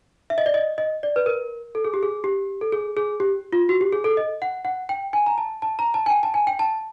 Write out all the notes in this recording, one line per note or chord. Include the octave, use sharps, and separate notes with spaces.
E5
D#5
D5
D#5
D#5
D5
B4
A#4
A4
G#4
G4
G#4
G4
A4
G#4
G#4
G4
F4
F#4
G4
G#4
A4
D#5
F#5
F#5
G5
G#5
A#5
A5
A5
A#5
A5
G#5
G5
A5
G#5
G5
A5